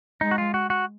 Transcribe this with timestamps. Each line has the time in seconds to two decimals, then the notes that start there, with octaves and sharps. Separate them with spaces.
0.21 G#3 D#4
0.31 F#4
0.38 F4
0.54 F#4
0.70 F#4